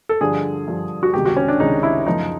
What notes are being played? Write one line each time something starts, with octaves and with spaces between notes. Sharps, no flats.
A4
G2 D3 F3 G#4
G2 D3 F3
F#4
C#2 C3 D#3 G4
F#4
C#4
D4
C#2 C3 D#3 D#4
E4
F#2 C#3 F3 D#4